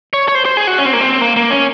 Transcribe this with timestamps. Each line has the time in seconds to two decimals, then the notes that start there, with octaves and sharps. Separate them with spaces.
0.13 C#5
0.28 C#5
0.35 C5
0.45 C5
0.57 G#4
0.67 F#4
0.78 C#4
0.86 C4
0.93 A#3
1.01 C4
1.21 A#3
1.36 A#3
1.51 C#4